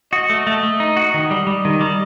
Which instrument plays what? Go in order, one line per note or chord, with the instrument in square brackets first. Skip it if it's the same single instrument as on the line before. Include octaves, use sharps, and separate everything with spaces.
[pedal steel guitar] F#4 [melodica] D#5
[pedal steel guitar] A3
A3
A3
D#4
F#4
[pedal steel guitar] D#3 [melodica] D#5
[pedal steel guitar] G3
G3
D#3
G3